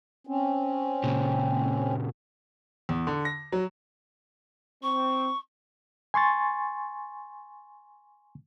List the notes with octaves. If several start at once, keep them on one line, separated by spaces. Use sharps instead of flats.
C4 C#4
A#2 C#3
E2
D3
A#6
F#3
C4 C#6
G#5 C6 C#6 A6